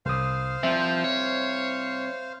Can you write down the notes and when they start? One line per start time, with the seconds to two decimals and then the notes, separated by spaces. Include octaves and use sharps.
0.06 C2 C5 F5 D#6
0.63 C2 F3 C4 E5
1.04 C#5